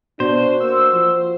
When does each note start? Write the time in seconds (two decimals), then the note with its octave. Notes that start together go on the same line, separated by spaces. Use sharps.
0.20 B2 D4 F#4 C5
0.60 A#3 E6
0.93 F3